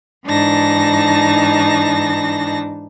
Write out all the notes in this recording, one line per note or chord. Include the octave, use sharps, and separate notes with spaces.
G#2 E3 D4 D#4 A5 A#6